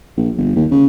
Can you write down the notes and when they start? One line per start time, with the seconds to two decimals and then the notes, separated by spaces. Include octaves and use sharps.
0.17 A#1
0.38 G1
0.55 D#2
0.71 C#3